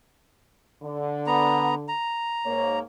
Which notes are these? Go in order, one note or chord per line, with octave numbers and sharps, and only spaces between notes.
D3
B3 A#5
A#5
G#2 A#3 C#5